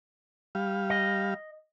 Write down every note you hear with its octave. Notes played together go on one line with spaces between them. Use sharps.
G3 F5
D#5